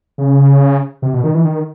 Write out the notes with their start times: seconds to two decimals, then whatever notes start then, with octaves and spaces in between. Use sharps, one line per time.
0.18 C#3
1.02 C3
1.14 B2
1.24 D#3
1.35 E3
1.45 D#3